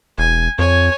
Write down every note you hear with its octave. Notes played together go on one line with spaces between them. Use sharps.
E1 G#5
F2 C#5 G#5